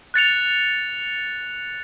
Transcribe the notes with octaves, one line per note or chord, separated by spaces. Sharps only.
F#6 A6 C#7 F7